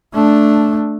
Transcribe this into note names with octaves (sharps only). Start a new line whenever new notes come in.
A3 D4